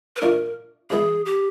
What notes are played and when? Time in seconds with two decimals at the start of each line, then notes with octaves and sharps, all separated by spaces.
0.16 B4
0.21 A#2 F3 A3 D4 A#4
0.90 C3 E3 G#3 B3 E4 G#4
1.26 G4